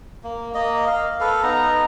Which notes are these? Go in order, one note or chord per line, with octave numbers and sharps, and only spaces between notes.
A#3
A#3 D#5
F5
A4 B4 F5
B3 D#4 A#5